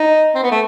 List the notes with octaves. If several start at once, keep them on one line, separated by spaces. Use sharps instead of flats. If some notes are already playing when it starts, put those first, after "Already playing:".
Already playing: D#4
C4
B3
A3